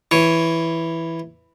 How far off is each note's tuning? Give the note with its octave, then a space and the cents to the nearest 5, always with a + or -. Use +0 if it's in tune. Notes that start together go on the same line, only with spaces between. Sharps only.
E3 +0 C#5 +0